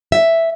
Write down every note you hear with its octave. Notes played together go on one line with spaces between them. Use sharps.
E5